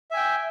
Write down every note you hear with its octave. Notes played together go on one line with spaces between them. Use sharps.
E5 G5 G#5